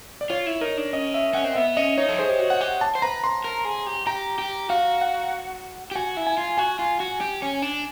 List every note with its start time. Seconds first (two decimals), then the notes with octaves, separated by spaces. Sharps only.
0.21 D5
0.30 F4 C#5
0.46 E4
0.61 D#4 A#4
0.77 D4
0.93 C#4 D#5
1.14 E5
1.33 C#4 F#5
1.44 C4
1.55 B3 E5
1.77 C#4 D#5
1.98 D#4 C#5
2.09 A4
2.18 G#4 C5
2.30 G4
2.39 F#4
2.50 F#5
2.61 G4
2.81 A5
2.95 C5
3.02 B4 A#5
3.24 C6
3.44 A#4
3.65 G#4
3.87 G4
4.07 G4 A#5
4.38 G4
4.70 F#4 F5
5.01 F#5
5.91 G4
5.95 F#4 G#5
6.17 E4
6.27 G#5
6.38 F4
6.57 F#4 G#5
6.79 F4
7.00 F#4
7.21 G4
7.42 C#4
7.62 D4